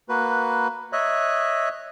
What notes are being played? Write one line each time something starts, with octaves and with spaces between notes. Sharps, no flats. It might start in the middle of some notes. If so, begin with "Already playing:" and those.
A#3 F#4 B4
C#5 D#5 E5 F#6